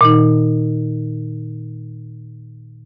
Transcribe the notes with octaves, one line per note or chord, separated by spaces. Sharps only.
A#2 D#3 D#4